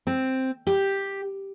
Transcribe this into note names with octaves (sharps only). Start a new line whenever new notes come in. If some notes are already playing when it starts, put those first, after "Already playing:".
C4
G4